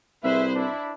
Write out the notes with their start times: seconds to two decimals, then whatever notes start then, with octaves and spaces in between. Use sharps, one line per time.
0.24 C2 G#4 B4 C5 E5
0.55 D4 E4